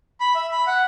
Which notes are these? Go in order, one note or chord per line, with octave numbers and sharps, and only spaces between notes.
B5
E5
B5
F#5